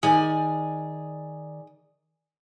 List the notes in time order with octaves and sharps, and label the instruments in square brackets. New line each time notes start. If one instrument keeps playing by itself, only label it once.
[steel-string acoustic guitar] D#3 D5 G#5 [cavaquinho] G#4